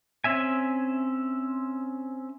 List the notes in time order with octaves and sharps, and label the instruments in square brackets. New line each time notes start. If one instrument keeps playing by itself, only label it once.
[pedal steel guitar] C4 C#4 E5 G#5